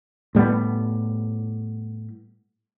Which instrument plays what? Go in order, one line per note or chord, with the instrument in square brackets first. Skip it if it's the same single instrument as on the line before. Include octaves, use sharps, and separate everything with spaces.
[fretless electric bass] A2 G3 A3 B3